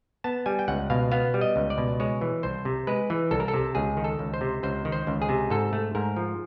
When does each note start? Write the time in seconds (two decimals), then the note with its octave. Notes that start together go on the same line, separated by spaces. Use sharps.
0.24 B3 A5
0.46 G3 G#5
0.59 G5
0.68 C#2 F#5
0.90 B2 F5
1.12 B3 F5
1.34 G3
1.41 D#5
1.56 C#2
1.70 D5
1.78 B2
2.00 G#3 C#5
2.21 E3
2.43 C2 C5
2.65 C3
2.87 G#3 B4
3.10 E3
3.31 C2 A4
3.40 A#4
3.48 A4
3.54 C3
3.75 C#2 G#4
3.97 D#3
4.04 A4
4.19 C#2
4.34 C5
4.41 C3
4.63 C#2 C5
4.85 D#3
4.92 C5
5.07 C#2
5.22 G#4
5.29 C3
5.50 G#2 A4
5.73 A3
5.95 G#2 A#4
6.16 F3